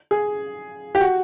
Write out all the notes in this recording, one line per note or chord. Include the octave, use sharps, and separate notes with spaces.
G#4
G4
F#4